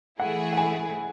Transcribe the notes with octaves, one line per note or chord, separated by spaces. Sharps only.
E3 A3 E4 G#4 F#5
F#5
G#5